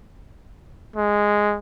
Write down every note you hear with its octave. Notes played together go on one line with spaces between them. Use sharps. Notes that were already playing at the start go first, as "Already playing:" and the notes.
G#3